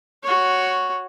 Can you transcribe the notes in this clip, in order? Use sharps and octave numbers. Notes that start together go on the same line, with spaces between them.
F#4 C#5